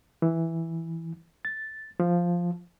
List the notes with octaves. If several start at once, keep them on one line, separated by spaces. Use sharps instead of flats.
E3
A6
F3